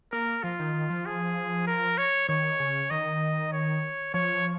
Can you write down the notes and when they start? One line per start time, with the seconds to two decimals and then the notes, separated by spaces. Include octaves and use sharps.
0.12 A#3 A#4
0.43 F3 F4
0.59 D#3
0.74 D#3
0.90 F3
1.06 G#4
1.67 A#4
1.98 C#5
2.29 D#3 C#5
2.60 C#3
2.90 D#3 D#5
3.52 C#5
4.14 F3 C#5